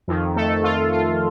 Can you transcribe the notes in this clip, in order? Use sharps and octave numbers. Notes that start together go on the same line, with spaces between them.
F2 D#3
A3 A4
F4
F4